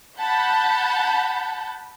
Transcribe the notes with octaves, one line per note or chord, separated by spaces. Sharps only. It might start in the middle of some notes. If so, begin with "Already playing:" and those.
F#5 A5 B5 G6